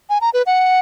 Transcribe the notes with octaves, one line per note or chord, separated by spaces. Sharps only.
G#5
A#5
B4
F#5